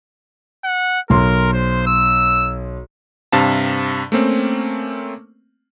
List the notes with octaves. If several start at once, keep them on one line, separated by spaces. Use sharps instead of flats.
F#5
B1 A#4 C6
C5
E6
G2 C3 F5 A5
A3 A#3 C4 C#4